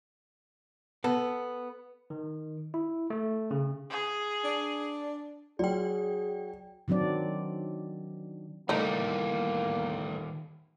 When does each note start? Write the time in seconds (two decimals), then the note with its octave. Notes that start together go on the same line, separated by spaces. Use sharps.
1.04 B3 A4
2.10 D#3
2.74 E4
3.10 A3
3.51 C#3
3.90 G#4
4.44 D4
5.59 F#3 G#4 D5 G5
6.88 D#3 F#3 C4 D4 D5
8.69 E2 A2 D#3 G3 A3 A#3 D#4